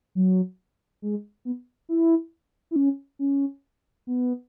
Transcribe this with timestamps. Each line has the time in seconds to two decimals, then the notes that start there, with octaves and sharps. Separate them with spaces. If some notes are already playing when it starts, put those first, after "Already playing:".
0.15 F#3
1.02 G#3
1.45 B3
1.89 E4
2.71 E4
2.76 C#4
3.19 C#4
4.07 B3